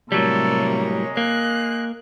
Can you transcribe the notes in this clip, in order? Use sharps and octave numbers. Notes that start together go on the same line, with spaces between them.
A2 C3 F#3 G3 A#3 A4 C#5
G#3
A#3 F#6